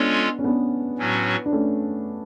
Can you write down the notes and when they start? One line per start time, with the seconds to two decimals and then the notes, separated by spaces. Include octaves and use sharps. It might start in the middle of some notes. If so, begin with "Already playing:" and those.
Already playing: G#3 B3 C#4 D4 F4 A4 C#5
0.39 C#4
0.44 B3 D4
0.98 A2 F#3 C#4 F#4
1.46 D4
1.52 A3 C#4